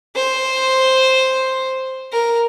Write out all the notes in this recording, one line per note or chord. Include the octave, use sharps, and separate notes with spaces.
C5
A#4